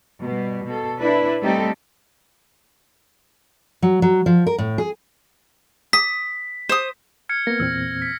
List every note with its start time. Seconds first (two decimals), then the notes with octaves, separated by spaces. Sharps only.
0.22 B2 G3
0.65 B2 A4
1.00 D4 E4 B4
1.41 G3 A3 C4 D#4 G4 A4
3.82 F#3
4.02 F#3
4.26 F3
4.47 A#4
4.58 A2
4.78 G#4
5.93 D#6 B6
6.69 C5 D#6
7.29 F6 G#6 C#7
7.47 A#3 B3 A#6
7.60 E2 A#2 C4 E6
8.02 B6